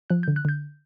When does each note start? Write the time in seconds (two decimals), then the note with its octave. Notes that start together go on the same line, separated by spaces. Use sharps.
0.10 F3 F#6
0.23 D3 G6
0.36 F#6
0.45 D3 G6